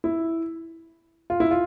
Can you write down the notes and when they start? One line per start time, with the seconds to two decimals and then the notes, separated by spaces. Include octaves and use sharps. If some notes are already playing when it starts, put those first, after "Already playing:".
0.04 E4
1.30 F4
1.40 E4
1.51 F4